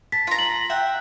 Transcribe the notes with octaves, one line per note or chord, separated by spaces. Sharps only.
A5 B6
F4 A#5
B6 F#7
E5 F#5 G5